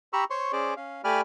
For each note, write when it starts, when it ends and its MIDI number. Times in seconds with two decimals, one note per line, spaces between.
0.13 0.24 67
0.13 0.24 82
0.13 0.24 83
0.13 0.24 85
0.13 0.24 88
0.30 0.52 72
0.30 0.52 73
0.30 0.52 84
0.30 0.52 85
0.53 0.74 61
0.53 0.74 68
0.53 0.74 72
0.53 0.74 74
0.77 1.01 61
0.77 1.01 77
1.04 1.21 57
1.04 1.21 67
1.04 1.21 74
1.04 1.21 80
1.04 1.21 83
1.04 1.21 89